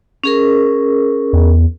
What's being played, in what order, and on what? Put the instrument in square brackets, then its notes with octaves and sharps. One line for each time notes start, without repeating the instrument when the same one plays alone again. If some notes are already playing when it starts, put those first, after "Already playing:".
[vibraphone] C#4 G#4 A#4
[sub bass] E2